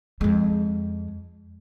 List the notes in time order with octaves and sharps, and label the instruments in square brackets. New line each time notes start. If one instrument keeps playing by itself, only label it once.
[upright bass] F2 G#3